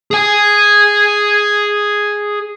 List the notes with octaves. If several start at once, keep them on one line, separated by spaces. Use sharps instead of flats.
G#4 G#5